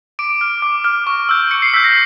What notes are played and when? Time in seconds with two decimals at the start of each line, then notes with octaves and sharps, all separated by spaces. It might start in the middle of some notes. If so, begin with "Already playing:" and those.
0.19 D6 D7
0.41 F6
0.62 D6
0.84 F6
1.07 C#6
1.29 E6 G6
1.51 C#6 C#7
1.62 C7
1.73 E6 G6 B6
1.84 A#6